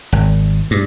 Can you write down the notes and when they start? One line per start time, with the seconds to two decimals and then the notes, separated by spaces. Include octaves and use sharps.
0.12 G#1
0.71 G2